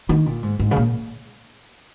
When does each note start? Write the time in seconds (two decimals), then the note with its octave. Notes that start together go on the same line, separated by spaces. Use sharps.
0.09 D#3
0.26 A#2
0.43 G#2
0.59 G#2
0.71 C#3
0.76 A#2